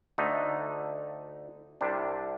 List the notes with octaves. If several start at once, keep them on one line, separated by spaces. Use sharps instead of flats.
D2 D3 A3 D#4
C2 C3 G3 D4